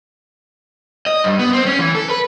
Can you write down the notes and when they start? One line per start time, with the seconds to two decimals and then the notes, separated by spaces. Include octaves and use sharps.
1.06 D#5
1.24 G2
1.39 B3
1.53 C4
1.66 C#4
1.79 E3
1.95 A4
2.10 B4